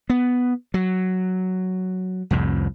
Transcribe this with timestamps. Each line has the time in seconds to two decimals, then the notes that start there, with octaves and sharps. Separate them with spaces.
0.10 B3
0.74 F#3
2.31 C2 F2 A2